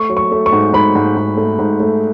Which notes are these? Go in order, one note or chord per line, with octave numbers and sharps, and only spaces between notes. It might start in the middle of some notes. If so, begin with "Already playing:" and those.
Already playing: A3 C#6
F#3
C#6
A3
C#6
G#2
G#2 B5
G#2
G#2
A3
G#2
A3